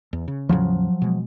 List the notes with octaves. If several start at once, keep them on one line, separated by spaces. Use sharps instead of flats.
E2
C#3
E2 A2 C#3 F3 F#3
B2 G#3